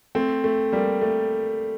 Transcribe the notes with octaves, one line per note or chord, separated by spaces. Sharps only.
A3 C4
A3
G3 A#3
A3